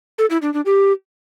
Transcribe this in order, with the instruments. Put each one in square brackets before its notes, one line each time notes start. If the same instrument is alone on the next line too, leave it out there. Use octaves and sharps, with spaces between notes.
[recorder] A4
E4
D4
D4
G4